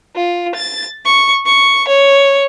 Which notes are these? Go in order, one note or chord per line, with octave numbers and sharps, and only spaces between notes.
F4
A6
C#6
C#6
C#5